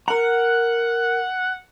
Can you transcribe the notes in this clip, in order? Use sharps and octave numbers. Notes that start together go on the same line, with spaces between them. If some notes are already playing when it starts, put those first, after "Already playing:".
A#4 F#5 A#5